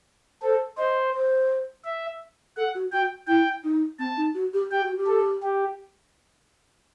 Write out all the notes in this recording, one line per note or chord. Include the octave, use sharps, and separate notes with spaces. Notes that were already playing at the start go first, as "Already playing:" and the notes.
A4 C5
C5 D#5
C5
E5
A4 F#5
F#4
F#4 G5
E4 G5
D#4
C4 A5
D#4
F#4
G4
G4 G5
F#4
G4
A4
G4